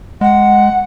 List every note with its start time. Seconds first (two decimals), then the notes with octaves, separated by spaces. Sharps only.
0.21 G#3 F#5